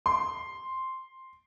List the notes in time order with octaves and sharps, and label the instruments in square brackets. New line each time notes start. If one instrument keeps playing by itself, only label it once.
[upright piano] C6